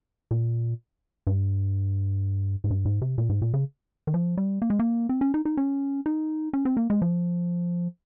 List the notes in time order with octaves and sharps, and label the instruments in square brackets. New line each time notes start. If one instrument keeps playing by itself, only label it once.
[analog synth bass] A#2
G2
G#2
G2
G#2
C3
A#2
G#2
A#2
C#3
D#3
F3
G3
A#3
G#3
A#3
C4
C#4
D#4
D#4
C#4
D#4
C#4
C4
A#3
G#3
F3